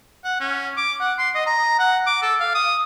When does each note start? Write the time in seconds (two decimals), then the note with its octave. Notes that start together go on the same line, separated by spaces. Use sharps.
0.24 F#5
0.40 C#4
0.77 D6
1.00 F#5
1.19 C6
1.35 D#5
1.46 A#5
1.79 F#5
2.06 D6
2.22 A4
2.40 F5
2.54 D#6